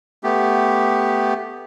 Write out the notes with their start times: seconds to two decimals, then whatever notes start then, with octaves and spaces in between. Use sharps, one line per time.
0.24 A3 B3 G4